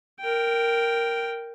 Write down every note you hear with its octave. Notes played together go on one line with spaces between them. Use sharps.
A#4 G5